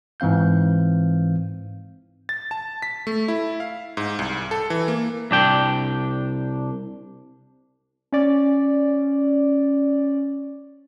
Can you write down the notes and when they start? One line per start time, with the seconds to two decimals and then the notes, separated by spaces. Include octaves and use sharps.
0.20 G#2 E3 C4 F5 G6
2.29 A6
2.51 A5
2.82 B6
3.07 A3
3.28 E4
3.60 F5
3.97 G#2
4.19 C2
4.51 A4
4.70 E3
4.88 A#3
5.31 C2 D4 G5
8.12 C#4 D5